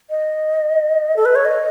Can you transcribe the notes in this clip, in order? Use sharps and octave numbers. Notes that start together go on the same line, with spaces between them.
D#5
A4
B4
C#5
D#5